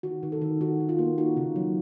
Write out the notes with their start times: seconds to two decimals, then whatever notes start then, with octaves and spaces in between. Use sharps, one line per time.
0.03 D#3 F#4
0.23 D#3
0.32 A4
0.42 D#3
0.61 D#3 F#4
0.80 D#3
0.89 F4
0.99 A#3
1.18 D#4 F#4
1.37 C#3
1.56 F#3